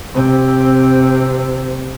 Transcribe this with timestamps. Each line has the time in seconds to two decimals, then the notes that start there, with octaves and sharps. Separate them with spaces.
0.14 C3 C4